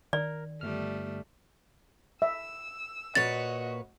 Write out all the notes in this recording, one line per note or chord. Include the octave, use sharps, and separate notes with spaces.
D#3 A#4 D5
G1 G3 A3 F6
E5 E6
A#2 F#4 B4 C#5 D#5 A6